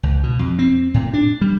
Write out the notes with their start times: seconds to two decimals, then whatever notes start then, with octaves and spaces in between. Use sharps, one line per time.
0.03 C#2
0.23 B2
0.39 F2
0.59 C4
0.94 A2
1.13 D4
1.41 G3